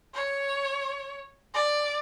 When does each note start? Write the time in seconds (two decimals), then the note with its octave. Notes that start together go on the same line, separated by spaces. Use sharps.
0.14 C#5
1.54 D5